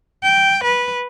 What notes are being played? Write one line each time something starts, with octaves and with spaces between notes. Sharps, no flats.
G5
B4